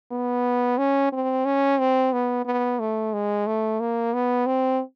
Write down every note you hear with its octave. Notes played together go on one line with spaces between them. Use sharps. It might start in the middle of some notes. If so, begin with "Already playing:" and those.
B3
C#4
C4
C#4
C4
B3
B3
A3
G#3
A3
A#3
B3
C4